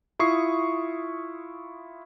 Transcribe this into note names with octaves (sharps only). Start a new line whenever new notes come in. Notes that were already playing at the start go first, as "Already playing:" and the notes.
E4 F4 C#6 D#6 C7